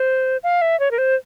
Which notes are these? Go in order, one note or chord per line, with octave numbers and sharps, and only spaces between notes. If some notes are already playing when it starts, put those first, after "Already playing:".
Already playing: C5
F5
E5
C#5
A#4
C5